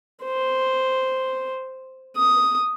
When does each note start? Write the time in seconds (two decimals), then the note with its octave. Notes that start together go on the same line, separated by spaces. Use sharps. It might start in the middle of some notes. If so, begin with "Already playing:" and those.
0.24 C5
2.16 D#6